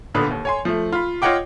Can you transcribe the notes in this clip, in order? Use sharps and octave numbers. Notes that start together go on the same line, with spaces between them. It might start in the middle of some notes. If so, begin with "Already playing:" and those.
D#1 A#2 D3 B3 B4 D#6
D#2
C#5 G#5 C6
F3 A3
F4 B5
F4 C#5 D#5 F#5 G5 D6